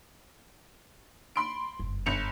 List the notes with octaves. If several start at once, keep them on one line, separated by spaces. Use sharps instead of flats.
B5 C6 D7
F#1 G2
G1 C#7 F7